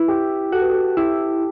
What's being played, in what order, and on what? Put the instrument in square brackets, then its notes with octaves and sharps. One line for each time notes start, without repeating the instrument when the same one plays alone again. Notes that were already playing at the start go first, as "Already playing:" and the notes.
Already playing: [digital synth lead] E4 [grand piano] B4
[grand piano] G4
[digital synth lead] F#4 [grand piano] A4
[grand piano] B4
A4
[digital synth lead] E4 [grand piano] G4